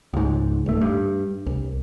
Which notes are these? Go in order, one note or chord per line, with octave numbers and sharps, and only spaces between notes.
C#2 G#2
D1 A3
G2
C2